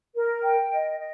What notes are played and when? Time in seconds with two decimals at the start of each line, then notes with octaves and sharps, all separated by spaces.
0.15 A#4
0.43 G5
0.72 D#5
0.99 D#5